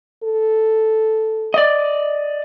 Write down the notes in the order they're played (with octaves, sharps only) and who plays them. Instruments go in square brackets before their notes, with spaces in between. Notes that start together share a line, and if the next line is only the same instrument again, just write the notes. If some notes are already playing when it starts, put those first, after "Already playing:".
[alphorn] A4
[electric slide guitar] D5 D#5